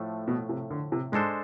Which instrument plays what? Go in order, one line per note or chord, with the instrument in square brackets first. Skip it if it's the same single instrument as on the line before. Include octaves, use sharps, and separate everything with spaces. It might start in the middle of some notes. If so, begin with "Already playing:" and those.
Already playing: [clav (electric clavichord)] A2 F3 A3
[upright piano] B2
C3
D3
C3
[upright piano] G#2 [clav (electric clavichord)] G#3 D4 A4 C5